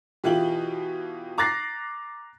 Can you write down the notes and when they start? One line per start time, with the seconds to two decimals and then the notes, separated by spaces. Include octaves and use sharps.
0.24 B2 E3 F4 G4 F#7
1.38 A#5 D6 F#6 A6 A#6 C7